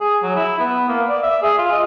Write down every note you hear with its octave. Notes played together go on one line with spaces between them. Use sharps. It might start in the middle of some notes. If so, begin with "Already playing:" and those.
G#4
F#3
E4
B3
A#3
D5
E5
G#4
F4
D#5